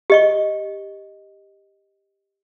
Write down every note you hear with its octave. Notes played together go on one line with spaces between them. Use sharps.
G4 D#5 C#6